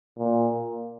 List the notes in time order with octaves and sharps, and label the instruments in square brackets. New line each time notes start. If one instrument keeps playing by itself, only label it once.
[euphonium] A#2